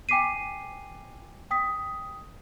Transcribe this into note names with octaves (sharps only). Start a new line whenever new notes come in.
G5 G#5 D6 B6 C7 D#7
G5 D#6 B6